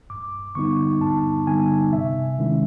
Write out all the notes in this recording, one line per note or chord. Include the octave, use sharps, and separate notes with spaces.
G2 D6
D3 G3 B3 D#4 C#6
G2 A5
D3 G3 B3 D#4 G#5
C3 E5
D#3 G#3 C#4 E4